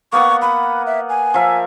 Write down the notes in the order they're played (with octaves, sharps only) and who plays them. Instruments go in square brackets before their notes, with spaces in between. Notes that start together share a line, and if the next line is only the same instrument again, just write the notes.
[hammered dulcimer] A#3 B3 F#5 [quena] C#6
[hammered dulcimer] F#5 [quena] B5
[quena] E5
G#5
[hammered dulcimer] F3 A#4 E5